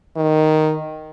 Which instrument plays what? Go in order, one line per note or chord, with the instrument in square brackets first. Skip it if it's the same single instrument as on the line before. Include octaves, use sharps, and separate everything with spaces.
[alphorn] D#3